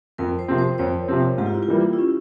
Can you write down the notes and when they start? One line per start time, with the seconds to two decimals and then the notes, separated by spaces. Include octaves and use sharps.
0.18 F2 A#4
0.39 C5
0.48 C3 F3 C4
0.58 C5
0.78 F2 C#5
1.08 C3 F3 C4
1.38 G#2 G4
1.46 F4
1.54 E4
1.63 F4
1.68 E3 G3 A#3
1.93 E4
1.99 C#4